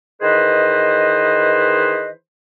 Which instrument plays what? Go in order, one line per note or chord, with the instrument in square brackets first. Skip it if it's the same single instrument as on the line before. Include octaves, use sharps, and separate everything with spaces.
[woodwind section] D#3 E3 G#4 B4 C5 D#5